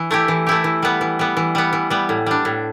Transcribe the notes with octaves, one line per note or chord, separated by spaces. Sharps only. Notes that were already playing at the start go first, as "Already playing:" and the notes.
Already playing: E3
A3 E4 G4
E3
A3 E4 G4
E3
G3 B3
E3
G3 B3
E3
G3 B3
E3
G3 B3
A2
G3 D4
A2